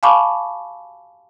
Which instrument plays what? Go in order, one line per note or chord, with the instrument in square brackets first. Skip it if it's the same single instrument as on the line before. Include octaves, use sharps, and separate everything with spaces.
[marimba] F5 G#5 A5 B5 C#6 D6